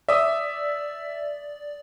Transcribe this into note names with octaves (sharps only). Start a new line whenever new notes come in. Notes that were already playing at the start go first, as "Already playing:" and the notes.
D5 E5 D#6